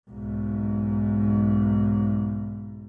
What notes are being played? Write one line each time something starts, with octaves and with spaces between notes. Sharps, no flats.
B1 G#2